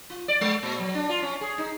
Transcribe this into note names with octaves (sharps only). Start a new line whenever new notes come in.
F4
D5
G#3
A#2
F#3
D4
F4
C#4
G#4
D#4